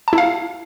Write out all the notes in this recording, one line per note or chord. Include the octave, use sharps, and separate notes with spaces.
A5
E4
F5